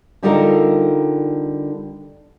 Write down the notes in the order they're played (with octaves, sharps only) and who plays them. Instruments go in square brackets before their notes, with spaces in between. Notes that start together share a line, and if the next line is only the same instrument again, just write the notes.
[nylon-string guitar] D3 G3 D#4 F4 A4 A#4